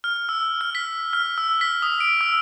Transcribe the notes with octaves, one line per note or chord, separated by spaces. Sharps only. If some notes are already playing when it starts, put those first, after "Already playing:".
F6
E6
F6
B6
F6
E6
B6
D#6
D7
E6